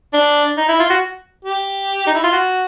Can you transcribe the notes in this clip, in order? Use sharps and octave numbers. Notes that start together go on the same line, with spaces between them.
D4
D#4
E4
F4
F#4
G4
D#4
E4
F4
F#4